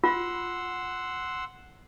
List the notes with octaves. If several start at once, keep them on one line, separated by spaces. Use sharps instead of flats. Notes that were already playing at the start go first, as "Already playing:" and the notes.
F4 F#5 C6 E6